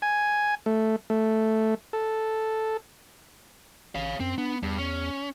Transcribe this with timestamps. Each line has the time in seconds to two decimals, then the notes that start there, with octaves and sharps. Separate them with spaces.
0.02 G#5
0.66 A3
1.10 A3
1.93 A4
3.95 A1 C#5 F5
4.20 F#2 C4
4.38 B3 D4
4.63 E2 G2
4.78 C#4